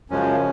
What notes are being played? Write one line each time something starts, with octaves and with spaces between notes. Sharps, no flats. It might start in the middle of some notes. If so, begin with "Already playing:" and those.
F#2 C#3 F3 G#3 C#4